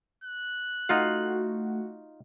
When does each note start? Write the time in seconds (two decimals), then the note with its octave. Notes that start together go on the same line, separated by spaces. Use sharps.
0.24 F#6
0.89 A3 D#4 F4 F#4 F5